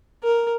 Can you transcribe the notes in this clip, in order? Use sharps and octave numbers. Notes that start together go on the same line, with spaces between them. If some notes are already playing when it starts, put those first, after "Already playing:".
A#4